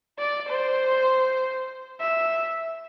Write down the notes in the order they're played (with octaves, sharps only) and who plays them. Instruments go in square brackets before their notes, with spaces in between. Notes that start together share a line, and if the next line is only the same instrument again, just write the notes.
[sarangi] D5
C5
E5